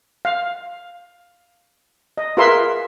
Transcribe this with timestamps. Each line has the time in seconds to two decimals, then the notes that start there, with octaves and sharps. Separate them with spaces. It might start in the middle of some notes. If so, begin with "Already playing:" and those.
0.25 F5
2.18 D#5
2.37 F4 G#4 A#4 B4 E5 C6